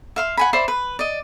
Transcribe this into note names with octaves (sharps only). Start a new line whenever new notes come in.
E5 F5 C6
F#5 G#5 B5
C5 D5 E5 B5
B4
D5 D#5